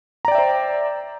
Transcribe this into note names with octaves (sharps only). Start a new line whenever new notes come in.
C5 D5 E5 G5 A#5